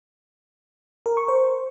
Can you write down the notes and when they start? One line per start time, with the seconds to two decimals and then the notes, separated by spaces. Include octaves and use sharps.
1.06 A#4
1.17 C#6
1.28 C5